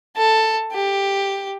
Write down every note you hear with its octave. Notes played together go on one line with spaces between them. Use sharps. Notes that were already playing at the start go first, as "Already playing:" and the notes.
A4
G4